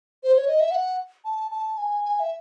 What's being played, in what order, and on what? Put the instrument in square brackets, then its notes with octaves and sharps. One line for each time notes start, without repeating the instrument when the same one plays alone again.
[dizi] C5
C#5
D#5
E5
F#5
A5
A5
G#5
G#5
E5